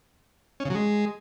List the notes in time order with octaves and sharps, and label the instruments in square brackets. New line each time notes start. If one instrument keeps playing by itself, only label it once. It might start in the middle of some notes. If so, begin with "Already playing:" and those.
[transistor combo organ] C#4
C#3
F#3
G#3